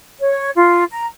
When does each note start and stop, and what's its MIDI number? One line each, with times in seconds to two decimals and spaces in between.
0.19 0.50 73
0.55 0.84 65
0.91 1.07 82